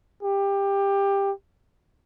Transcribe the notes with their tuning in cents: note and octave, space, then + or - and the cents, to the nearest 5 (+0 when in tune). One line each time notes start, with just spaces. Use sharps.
G4 +20